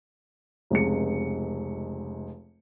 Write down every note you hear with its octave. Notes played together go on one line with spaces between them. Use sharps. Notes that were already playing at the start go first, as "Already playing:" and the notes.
F1 C#2 C#7